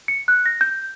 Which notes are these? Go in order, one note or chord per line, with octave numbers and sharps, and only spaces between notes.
C#7
F#6
A#6
G6